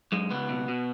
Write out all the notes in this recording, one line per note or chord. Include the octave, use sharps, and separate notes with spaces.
F#2 G#3
C#2 B3
B2
B2